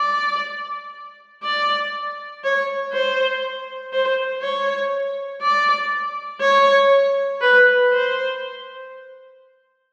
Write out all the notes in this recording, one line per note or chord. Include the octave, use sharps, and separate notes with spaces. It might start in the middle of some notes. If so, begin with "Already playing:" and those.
Already playing: D5
D5
C#5
C5
C5
C#5
D5
C#5
B4
C5